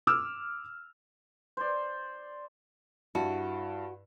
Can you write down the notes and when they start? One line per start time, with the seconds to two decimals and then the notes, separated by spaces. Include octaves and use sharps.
0.07 D6 E6 F6
1.57 C5 D5
3.15 G2 E4 F#4 A5